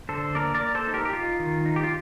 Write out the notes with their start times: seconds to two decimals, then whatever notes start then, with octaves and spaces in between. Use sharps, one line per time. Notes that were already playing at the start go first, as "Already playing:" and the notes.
0.09 D3 A4 C5
0.35 A#3 A#4 D5
0.54 A#4 D5
0.61 A#3
0.75 A4 C5
0.87 D#4
0.94 G4 A#4
1.05 G4
1.13 D#4 F4
1.39 D#3
1.65 D#4
1.76 G4
1.84 F4